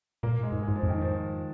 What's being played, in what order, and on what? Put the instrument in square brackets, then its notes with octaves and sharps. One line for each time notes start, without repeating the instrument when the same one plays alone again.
[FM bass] A#2 [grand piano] A#3
[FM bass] G#2 [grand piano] G#3
[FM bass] G#2
[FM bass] G#2 [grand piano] G#3
[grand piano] F3
[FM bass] F2
[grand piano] D#3
F3